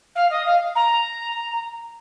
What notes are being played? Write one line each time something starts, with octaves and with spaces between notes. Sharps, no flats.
F5
D#5
F5
A#5